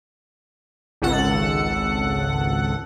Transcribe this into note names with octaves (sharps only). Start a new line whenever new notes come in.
G#1 C#2 A4 F#5